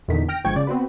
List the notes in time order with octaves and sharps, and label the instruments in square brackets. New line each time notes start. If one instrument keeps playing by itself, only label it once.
[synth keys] E2 A#2 D3 D#3 B6
G5 F6 A#6 D7
G1 F3 G#3 G5 C#6 G#6
C#3 D5
B3 C4 F#4 B4